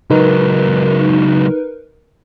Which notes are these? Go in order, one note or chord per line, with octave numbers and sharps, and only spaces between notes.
C#2 F#3 D#4 A#4 B4